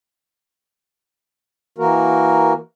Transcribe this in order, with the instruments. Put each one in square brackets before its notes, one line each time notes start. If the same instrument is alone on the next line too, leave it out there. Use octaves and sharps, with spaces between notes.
[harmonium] E3 A#3 F#4 A#4